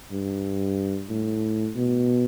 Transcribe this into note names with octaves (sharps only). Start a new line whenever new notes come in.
G2
A2
B2